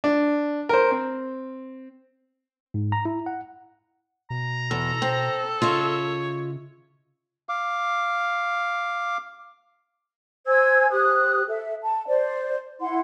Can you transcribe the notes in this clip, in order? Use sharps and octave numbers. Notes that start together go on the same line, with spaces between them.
D4
A#4 C5
C4
G#2
A#5
E4
F#5
B2 A#5
E2 A4
C4
C#3 F4 C#5 D#5 E5
F5 D6
C5 G#5 E6 G#6
G4 C5 D#6 F#6
A4 E5
A5
C5 D5
E4 F#5 C6